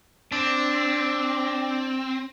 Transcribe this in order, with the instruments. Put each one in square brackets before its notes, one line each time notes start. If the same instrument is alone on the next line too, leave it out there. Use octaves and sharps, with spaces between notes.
[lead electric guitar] C4 [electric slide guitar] D4